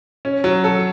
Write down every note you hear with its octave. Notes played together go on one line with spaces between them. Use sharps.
C#4
F#3
A4